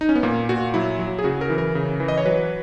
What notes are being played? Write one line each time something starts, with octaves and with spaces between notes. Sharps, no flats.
D#4
C#4
B3
A#2 A#3
A#2 F#4
F#3 E4
F#3
G#4
C#3 F#4
A#4
E3
A#4
C#3
E3
D#5
C#5
F#3 B4